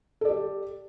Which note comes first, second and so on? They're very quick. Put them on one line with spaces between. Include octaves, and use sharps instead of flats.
A4 D5 G4